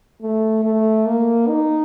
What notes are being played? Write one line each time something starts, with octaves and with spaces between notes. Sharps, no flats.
A3
A3
A#3
D#4